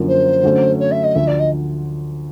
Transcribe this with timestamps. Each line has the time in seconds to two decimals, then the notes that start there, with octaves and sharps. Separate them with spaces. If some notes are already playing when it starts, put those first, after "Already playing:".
Already playing: F#2 D3 F3 A#3
0.08 C5
0.43 D3 F#3 A3 C#4
0.80 C#5
0.92 E5
1.04 D#5
1.15 D2 D3 F3 E5
1.27 D5
1.39 D#5